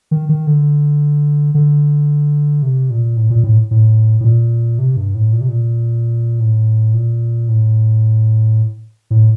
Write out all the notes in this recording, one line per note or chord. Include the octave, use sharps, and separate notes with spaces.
D#3
D#3
D3
D3
C3
A#2
A2
A#2
A2
A2
A2
A#2
C3
G2
A2
A#2
C3
A#2
A2
A#2
A2
A2